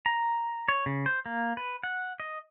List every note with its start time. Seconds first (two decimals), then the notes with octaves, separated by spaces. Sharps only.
0.06 A#5
0.69 C#5
0.86 C#3
1.06 C5
1.26 A#3
1.57 B4
1.83 F#5
2.20 D#5